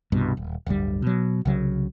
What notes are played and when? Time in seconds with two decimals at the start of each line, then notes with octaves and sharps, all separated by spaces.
0.12 C2 G2 B2
0.37 D#1
0.66 D1 G1 D2 G3
1.02 B2 F#3
1.45 C2 C#3 F#3